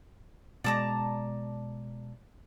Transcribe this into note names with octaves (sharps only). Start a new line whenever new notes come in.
B2 G#3 D5 A5 A#5